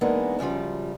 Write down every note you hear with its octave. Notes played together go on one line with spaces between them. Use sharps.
E3 G#3 A#3 B3 D4 D#4
F#2 C#3 F3 G3 F4